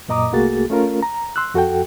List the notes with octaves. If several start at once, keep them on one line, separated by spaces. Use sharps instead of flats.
F#2 A#2 D#5 A#5 D6 D#6
C2 A3 A#3 F#4 G#4 A6
A3 C#4 F4 A#4
A#5
C6 E6 F#6
F2 F#4 A4 F#5 G5